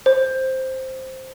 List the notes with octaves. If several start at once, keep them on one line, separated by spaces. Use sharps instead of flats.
C5